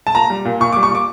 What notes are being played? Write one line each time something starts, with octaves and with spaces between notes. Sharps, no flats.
A5
A#2 A#5
G3
A#2
A#2 C#6
D6
G3
C#6
A#2 D6